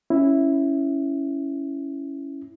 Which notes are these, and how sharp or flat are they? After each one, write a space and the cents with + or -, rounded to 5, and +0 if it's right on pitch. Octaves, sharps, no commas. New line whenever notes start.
C#4 +0 E4 +0